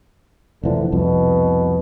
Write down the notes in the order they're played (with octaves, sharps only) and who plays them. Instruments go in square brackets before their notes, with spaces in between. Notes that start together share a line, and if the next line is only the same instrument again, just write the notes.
[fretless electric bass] F1 E3 F3 [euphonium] D3
[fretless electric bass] C2 F2 [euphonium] B2